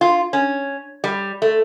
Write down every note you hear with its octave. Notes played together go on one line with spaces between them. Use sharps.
F4
C#4
G3
A3